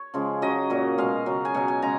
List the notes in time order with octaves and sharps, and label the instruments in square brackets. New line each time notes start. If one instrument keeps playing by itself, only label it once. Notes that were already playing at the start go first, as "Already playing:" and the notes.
Already playing: [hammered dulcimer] C#5
C#3 F3 G#3
C#3 F#3 D#5
A#2 F#3
B2 G#3 F5
C#3 F#3
G#5
B2 F#3 F#5
G#5
C#3 G#3 A#5